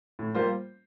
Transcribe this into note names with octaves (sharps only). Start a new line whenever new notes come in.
A2
G3 A#3 F4 C5